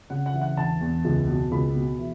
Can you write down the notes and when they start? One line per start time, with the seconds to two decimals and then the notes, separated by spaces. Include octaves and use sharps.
0.10 C#3 F#5
0.26 F#5
0.34 E3
0.41 F#5
0.57 E1 A5
0.81 E2
1.04 C#2
1.28 B2
1.51 C#2 B5
1.75 B2
1.98 E3